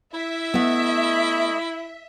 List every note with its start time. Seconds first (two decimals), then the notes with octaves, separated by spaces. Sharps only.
0.14 E4 E5
0.54 A3 B3 D#5 F#5